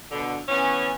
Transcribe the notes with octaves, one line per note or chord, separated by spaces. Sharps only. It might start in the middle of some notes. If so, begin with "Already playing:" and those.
B2 D3
E3 B3 C#4